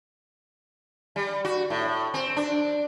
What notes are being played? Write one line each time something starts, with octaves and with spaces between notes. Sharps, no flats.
G3
F#4
A2
C4
D4